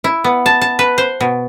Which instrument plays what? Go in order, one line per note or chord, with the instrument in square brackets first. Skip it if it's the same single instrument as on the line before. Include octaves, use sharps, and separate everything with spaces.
[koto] E4
B3
A5
A5
B4
C5
B2